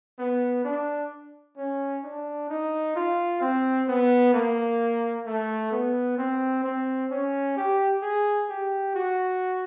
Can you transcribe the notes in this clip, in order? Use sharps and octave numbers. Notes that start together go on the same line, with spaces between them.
B3
D4
C#4
D4
D#4
F4
C4
B3
A#3
A3
B3
C4
C4
C#4
G4
G#4
G4
F#4